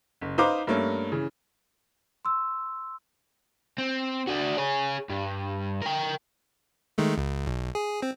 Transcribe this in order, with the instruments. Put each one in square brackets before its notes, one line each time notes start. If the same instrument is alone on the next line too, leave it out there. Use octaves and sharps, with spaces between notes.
[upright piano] F#1
D#4 B4 C5 F5 A#5 D6
G2 A3 A#3 C#4
C#3 E3
[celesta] C6 E6
[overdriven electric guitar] C4
D4 F#4
G#4 C#5
G2
A#4 G5
[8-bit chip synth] D#3 G#3 A3
C#2
B1
G#4
C4